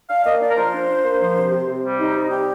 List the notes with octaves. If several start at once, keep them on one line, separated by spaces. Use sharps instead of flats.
D4 F5
A#3 D#5
D4 D5
A#4
F3 C5
D4
D4
A#3
F3
C3
C3
C3
G3
C3 D#4
C3
G3 G4